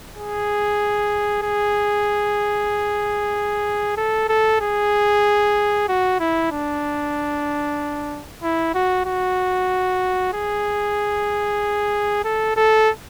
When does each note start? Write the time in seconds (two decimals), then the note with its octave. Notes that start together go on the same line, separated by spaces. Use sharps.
0.16 G#4
1.42 G#4
3.97 A4
4.29 A4
4.61 G#4
5.88 F#4
6.20 E4
6.51 D4
8.43 E4
8.74 F#4
9.06 F#4
10.33 G#4
12.24 A4
12.56 A4